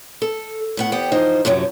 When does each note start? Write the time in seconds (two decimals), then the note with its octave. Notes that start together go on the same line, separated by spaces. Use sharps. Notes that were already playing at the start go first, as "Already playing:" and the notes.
0.22 A4
0.77 A2 B3 F#5
0.92 E2 B3 C4 G4 F#5 G5
1.12 E3 F3 D#4 C5
1.45 F#2 C3 F3 F#3